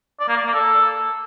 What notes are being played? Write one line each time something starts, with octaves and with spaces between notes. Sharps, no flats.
D5
A#3
D5
A#3
A4